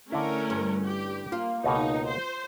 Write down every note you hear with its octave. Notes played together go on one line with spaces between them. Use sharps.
D3 A3 C#4 D4 E4 A#4
G2
G4
A#3 F4
C#2 B2 A#3 D#4
C5